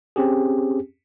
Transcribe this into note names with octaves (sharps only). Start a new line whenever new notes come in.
C4 C#4 G4 G#4